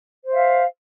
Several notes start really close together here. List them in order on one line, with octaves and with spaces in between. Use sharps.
C5 E5 F5